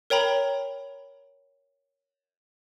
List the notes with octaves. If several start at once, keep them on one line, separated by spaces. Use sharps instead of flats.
A#4 C#5 G5 A#5 B5